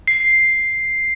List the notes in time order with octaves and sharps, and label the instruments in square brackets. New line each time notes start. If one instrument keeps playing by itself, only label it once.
[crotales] C7